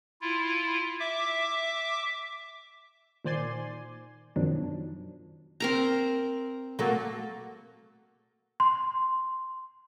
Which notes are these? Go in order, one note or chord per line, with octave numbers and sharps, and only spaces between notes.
E4 F4
E5 D6
A#2 D#3 C5 D5 G#5 C6
F#2 B2 D#3 F3 F#3 D4
C4 A#4 A#5
F#3 A3 A#3
C6